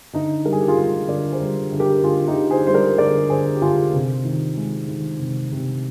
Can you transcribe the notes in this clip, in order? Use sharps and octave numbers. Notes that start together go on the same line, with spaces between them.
D3 D#4
G3 A#4
G#4
G4
F4 G#4
G3
D3 A#4 D5
G#4 C5
G3
D3
G4 A#4
D3 F4 G#4
D#4 G4
D3
G#4 C5
G3 C5
A#4 D5
D3 A#4 D5
D3 G#4 C5
G4
D3 F4 G#4
C3
D#3
G#3
D#3
C3
C3